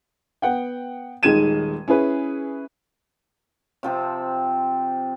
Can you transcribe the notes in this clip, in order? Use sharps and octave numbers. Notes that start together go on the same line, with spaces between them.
B3 F#5 G5
D#1 D#3 G#3 G#6 D#7 E7
C#4 E4 G#4 B4
C3 F3 C4